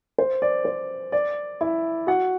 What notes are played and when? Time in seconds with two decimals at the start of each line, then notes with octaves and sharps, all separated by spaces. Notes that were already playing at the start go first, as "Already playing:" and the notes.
0.18 C5
0.42 D5
0.65 C5
1.12 D5
1.61 E4 E5
2.07 F#4 F#5